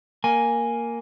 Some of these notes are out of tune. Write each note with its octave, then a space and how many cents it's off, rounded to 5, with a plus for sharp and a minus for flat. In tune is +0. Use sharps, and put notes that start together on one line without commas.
A#3 +0 G#5 +0